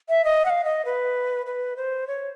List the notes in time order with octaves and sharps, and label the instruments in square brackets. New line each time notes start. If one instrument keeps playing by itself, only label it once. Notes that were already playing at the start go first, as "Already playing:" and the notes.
[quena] E5
D#5
F#5
F5
D#5
B4
B4
C5
C#5